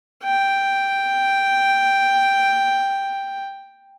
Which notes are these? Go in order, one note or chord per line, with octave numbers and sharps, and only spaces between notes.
G5